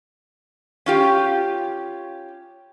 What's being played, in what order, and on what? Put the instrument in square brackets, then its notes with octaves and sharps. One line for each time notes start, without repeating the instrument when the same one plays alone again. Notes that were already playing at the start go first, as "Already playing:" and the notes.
[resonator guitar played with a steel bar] C#4 F4 G4